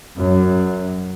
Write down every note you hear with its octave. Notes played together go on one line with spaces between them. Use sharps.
F#2 F#3